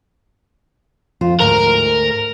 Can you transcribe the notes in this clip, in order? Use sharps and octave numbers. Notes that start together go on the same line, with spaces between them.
F2 F4 C5
D2 G#2 A#4